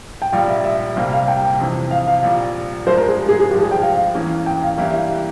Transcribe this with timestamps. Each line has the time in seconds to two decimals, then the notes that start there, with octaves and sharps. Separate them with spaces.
0.22 G5
0.32 A#1 A#2 G3 F5
0.48 E5
0.64 E5
0.96 C2 C3 G3 A#3 F5
1.12 F5
1.28 G5
1.59 F2 C3 E3
1.91 F5
2.07 F5
2.23 A#1 A#2 G3
2.87 G2 F3 G#3 C5
2.98 A#4
3.09 G#4
3.29 G#4
3.40 G#4
3.50 G#1 G2 F3 G4
3.61 G#4
3.71 G5
3.82 F5
4.15 E2 E3 A#3 C#4
4.46 G5
4.62 F5
4.78 G2 E3 A#3 E4 G4 E5
4.94 F5
5.09 E5